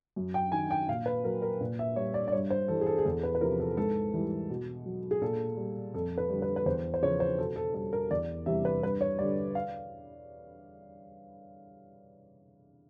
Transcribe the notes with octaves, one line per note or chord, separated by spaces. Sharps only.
F#2
G5
D#3 F#3 G#5
G5
A#2 F5
B4
F#3 A#4
A#4
A#2
E5
G3 C#5
D5
D5
G2 C#5
C5
E3 G3 A4
G#4
A4
G#4
E2 A4
B4
B4
C3 F3 A#4
A4
G#2 A4
E3 G3
B2
F#3
G#4
A#2 A4
G3
F2 A4
B4
D3 G3
B4
B4
E2 C5
C5
C#3 F3 C#5
C5
B2 A4
A4
G3 A4
A#4
E2 D5
C3 E3 G3 E5
B4
G2 B4
C#5
D3 G3 D5
F5